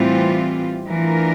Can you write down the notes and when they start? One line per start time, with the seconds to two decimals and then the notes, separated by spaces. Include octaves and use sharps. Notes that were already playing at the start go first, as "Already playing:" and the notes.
Already playing: A2 E3 G3 C4 F4
0.89 E3 A3 D4 F4 A#4